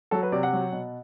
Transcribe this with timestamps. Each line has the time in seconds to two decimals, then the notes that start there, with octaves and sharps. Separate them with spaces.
0.11 F#3 A4
0.23 B4
0.32 C3 D5
0.43 F#5
0.53 F#3
0.72 B2